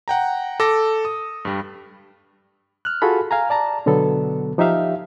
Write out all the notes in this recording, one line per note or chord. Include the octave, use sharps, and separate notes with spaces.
F#5 G5 A#5
A4 D6 A#6
D#6
G2 G3
F6 F#6
F4 F#4 G#4 A4 B5
F5 G#5 A#5
D5 A5 A#5
B2 D3 F#3 B3 A4
F3 D#4 G4 E5 F5